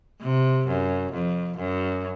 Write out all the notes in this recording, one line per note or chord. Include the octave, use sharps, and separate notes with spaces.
C3
F#2
F2
F#2